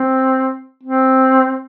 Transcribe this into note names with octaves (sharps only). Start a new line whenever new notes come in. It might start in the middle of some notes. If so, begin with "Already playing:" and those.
Already playing: C4
C4